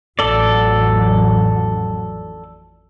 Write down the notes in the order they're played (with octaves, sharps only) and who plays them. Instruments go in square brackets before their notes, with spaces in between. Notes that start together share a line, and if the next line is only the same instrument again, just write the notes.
[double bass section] A1 F2 F#3 [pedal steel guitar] A4 D5